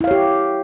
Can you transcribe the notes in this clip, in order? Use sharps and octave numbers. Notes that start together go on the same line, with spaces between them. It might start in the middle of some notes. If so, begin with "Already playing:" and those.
E4 G4 C#5 F5